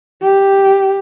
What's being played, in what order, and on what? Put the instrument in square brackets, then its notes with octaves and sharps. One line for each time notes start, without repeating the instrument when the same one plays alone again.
[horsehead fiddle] G4